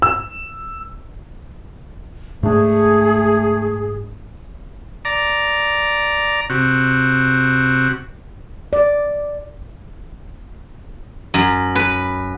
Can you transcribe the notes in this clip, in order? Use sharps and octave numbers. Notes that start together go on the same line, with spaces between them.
E6
G#2 A3 D4 G#4
D5 A#5
C3 F#4
D5
F#2
B4